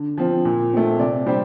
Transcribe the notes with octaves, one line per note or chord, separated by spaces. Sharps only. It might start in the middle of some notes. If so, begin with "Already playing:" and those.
Already playing: D3
F3 C4
A#2
A3 C4
C3 D5
G3 C4 C5